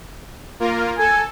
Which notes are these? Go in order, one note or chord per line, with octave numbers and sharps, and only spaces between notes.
A#3 F4 A#4
A4 G#5